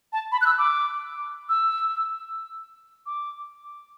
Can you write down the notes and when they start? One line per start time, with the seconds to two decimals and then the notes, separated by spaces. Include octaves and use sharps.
0.13 A5
0.32 B5
0.41 F#6
0.46 E6
0.58 D6
1.49 E6
3.06 D6